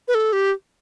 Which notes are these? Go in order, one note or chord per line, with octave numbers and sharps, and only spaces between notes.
B4
A4
G4